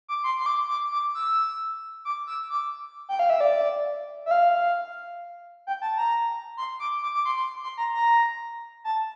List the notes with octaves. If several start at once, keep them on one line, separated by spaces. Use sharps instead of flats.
D6
C6
C6
D6
D6
D6
E6
D6
E6
D6
G5
F5
E5
D5
E5
F5
G5
A5
A#5
C6
D6
D6
D6
C6
C6
C6
A#5
A#5
A5